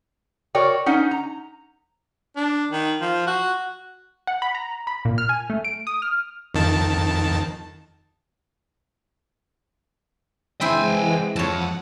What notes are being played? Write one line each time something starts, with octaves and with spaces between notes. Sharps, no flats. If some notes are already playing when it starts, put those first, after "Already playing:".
F#4 A#4 C#5 D5 G5
C#4 D#4 F#5
A#5
D4
D#3
F3
F#4
F#5
B5
A#5
B5
A#2
F6
G#5
A3
D7
D#6
F6
F2 D#3 A5
E3 G#3 C4 E4 C5 G5 G#5
F2 C#5 F#5 A5